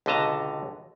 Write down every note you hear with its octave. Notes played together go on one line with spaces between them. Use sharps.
C#2 B2 D3 D#5 A5 A#5